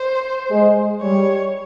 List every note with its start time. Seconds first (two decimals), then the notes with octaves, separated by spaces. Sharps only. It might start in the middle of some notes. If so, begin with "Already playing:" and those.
Already playing: C5
0.50 G#3
1.01 G3 C#5